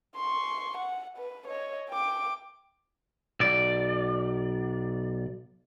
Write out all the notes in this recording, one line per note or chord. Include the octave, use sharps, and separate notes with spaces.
C6 C#6
F#5
B4
C#5 D#5
G5 D6
B1 D5